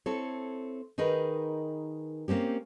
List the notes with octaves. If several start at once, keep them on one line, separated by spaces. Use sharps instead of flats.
C4 E4 A4 C#5
D#3 D#4 G#4 A#4 B4
A#3 C4 C#4 G4